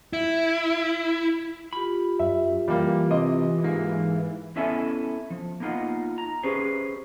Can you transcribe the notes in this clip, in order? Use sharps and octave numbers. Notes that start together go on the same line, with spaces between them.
E4
F4 G4 B5
F#2 E5
E3 G3 A#3
C3 D#5
G#2 A#3
B3 C#4 E4 A4 E5 G#5
F3
A#3 B3 D#4 F4 F#5
A#5
C#4 G4 G#4 B4 C5